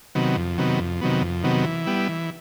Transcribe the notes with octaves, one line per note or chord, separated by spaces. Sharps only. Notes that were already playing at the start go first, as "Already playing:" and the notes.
C3 D#3 F#3 B3
F2
C3 D#3 F#3 B3
F2
C3 D#3 F#3 B3
F2
C3 D#3 F#3 B3
E3
G3 B3 E4
E3